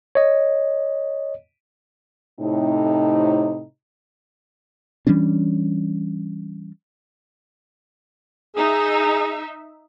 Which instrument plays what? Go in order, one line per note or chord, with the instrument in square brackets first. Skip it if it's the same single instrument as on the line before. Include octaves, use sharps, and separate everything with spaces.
[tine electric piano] C#5 D#5
[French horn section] A2 C3 D#4
[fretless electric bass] E3 G3 C#4 D4
[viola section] D#4 E5 [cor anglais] G#4